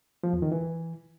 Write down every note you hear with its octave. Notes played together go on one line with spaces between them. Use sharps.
F3
E2
D#3
E3